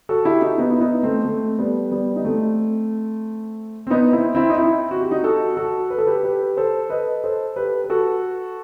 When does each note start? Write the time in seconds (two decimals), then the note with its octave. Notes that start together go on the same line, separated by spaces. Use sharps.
0.09 F#4 A4
0.25 E4 G4
0.42 D#4 F#4
0.58 B3 D#4
0.70 E4
0.80 B3 D#4
1.03 A3 C4
1.25 A3
1.59 G3 B3
1.91 G3 B3
2.16 D#4
2.24 A3 C4
3.87 C4
3.90 B3 D#4
4.13 C4 E4
4.35 C4 E4
4.50 D#4
4.57 C4 E4
4.91 F#4
5.01 G4
5.11 D#4 F#4
5.24 F#4 A4
5.57 F#4 A4
5.90 B4
5.98 A4
6.07 G4 B4
6.23 G4 B4
6.57 A4 C5
6.90 B4 D#5
7.24 A4 C5
7.56 G4 B4
7.84 B4
7.90 F#4 A4